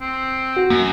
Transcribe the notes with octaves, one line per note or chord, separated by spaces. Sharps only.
C4
F#4
F#2 A#3